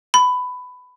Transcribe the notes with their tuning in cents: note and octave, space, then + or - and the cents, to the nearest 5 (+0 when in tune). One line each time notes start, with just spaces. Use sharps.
B5 +15